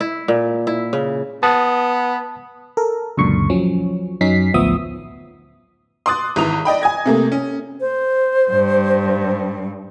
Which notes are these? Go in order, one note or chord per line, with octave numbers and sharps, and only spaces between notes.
E4
A#2
E4
C#3
B3 A5 D#6
A4 A#4
C#2 F#2 A#2 D3 C#6
F3 F#3 C#4
F#2 F#3 C#4 D#4 B6 C7
A1 D2 F3 B3 E5 D#6
C6 D6 D#6 F#6 A6
G#1 E3 A#5 D#6 F7
D5 D#5 G5 B5
G#5 D#6 G#6 A#6
C3 A3 A#3
C#4
C5
G2